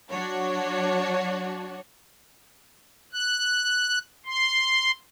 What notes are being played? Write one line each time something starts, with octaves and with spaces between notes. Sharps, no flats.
F#3 D4 F#4 C#5
F#6
C6